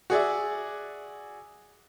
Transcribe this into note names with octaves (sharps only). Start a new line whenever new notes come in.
F#4 G#4 D5 E5